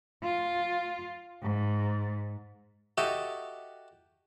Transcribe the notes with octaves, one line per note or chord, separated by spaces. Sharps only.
F4
G#2
F#4 G4 A4 D#5 E5